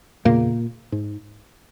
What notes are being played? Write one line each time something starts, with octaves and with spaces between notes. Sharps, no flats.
E2 A#2 C#3 A#3
G#2